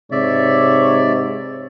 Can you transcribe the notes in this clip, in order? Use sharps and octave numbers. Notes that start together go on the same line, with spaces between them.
G#2 C3 C#5 D5 E5